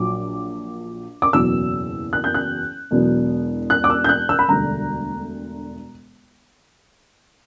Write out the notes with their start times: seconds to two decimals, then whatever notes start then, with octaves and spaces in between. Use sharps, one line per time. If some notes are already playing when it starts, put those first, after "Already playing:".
Already playing: A#1 A#2 F#3 D6
1.22 D6
1.33 F#1 E2 B2 F#3 B3 E6
2.13 F#6
2.24 G6
2.34 F#6
2.91 E1 E2 B2 F#3 B3
3.70 F#6
3.84 D6
3.90 E6
4.04 G6
4.09 F#6
4.29 E6
4.39 B5
4.48 E1 D2 D3 G3 A#5